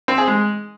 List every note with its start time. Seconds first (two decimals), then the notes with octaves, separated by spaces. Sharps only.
0.08 C4
0.18 G#4
0.28 G#3